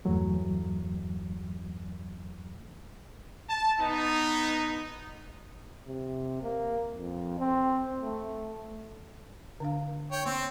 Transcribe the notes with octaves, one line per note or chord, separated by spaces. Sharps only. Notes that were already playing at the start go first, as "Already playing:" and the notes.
E2 G2 E3 F#3 A3
A5
B3 D#4
C3
A#3
F2
C4
A3
D3 D4 F5
C#5 G5
A#3 C4 C#6